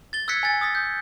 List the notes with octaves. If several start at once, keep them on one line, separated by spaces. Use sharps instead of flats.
A6 G7
E6 F#6 G#6 B6 C#7
G#5 A6
D#6 E6 A6 B6
G6